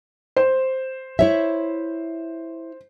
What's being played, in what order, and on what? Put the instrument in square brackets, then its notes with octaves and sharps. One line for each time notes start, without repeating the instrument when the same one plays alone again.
[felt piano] C5
[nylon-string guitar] E4 C#5 E5